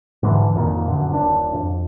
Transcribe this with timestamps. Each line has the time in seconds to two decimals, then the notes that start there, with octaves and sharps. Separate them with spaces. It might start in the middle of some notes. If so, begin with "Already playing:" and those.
0.23 G#2 D3 E3
0.55 F2 A#2 D#3
0.88 F#2 D3
1.10 D#1 C#4 D4
1.54 F2